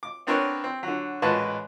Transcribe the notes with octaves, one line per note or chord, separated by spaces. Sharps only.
D6
B3 C4 D4 A#4 B4 C#5
C4
D3 F#3
A1 A#2 G#3 F#4 B4 A5